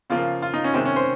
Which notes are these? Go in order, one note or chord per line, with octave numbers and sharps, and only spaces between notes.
C#3 F3 A#3 F4
F4
D#4
C#4
C3 D#3 G#3 C4
C#4
C5